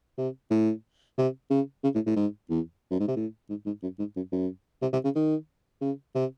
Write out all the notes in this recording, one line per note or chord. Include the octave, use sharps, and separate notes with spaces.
C3
A2
C3
C#3
C#3
A2
A2
G#2
E2
F#2
G#2
C3
A2
G#2
G#2
F#2
G#2
F#2
F#2
C3
C3
C#3
D#3
C#3
C3